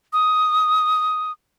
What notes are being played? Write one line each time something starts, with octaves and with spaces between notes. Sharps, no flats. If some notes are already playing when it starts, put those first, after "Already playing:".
D#6